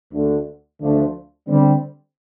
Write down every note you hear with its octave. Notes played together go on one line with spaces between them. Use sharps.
D2 D3 A3
D2 D3 F3 A3 D4
D3 G3 C4